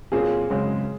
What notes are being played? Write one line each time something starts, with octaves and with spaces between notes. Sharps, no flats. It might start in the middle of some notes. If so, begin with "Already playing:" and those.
A#2 F#3 C4 F4 G#4
G#1 F#2 C#3 G#3 C4